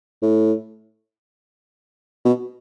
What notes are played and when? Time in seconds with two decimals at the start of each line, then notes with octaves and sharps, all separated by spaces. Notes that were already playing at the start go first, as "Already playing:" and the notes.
0.22 A2
2.25 B2